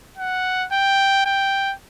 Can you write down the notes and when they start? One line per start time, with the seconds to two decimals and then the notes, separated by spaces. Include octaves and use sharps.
0.18 F#5
0.72 G5
1.25 G5